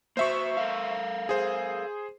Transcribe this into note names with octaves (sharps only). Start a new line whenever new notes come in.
A#3 F#4 C5 E5 C#6
A4 A#4 F5
G#4 C5